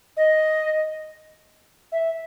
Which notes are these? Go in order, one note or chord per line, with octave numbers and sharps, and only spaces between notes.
D#5
E5